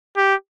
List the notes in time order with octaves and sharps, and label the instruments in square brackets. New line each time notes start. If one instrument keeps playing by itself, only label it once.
[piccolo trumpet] G4